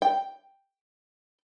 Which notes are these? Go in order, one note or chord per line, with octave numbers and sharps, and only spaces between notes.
G5